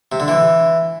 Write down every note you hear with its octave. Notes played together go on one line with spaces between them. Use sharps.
C3
D3
E3